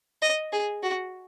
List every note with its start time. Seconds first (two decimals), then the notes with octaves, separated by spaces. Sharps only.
0.22 D#5
0.53 G#4
0.83 F#4